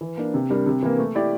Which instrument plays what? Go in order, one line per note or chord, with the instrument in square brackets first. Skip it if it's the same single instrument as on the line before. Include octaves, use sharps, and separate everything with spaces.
[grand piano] E3
A#3 D4
C3
G3 D4 G4 A#4
C3
E3 A#3
A3
E4 G4 D5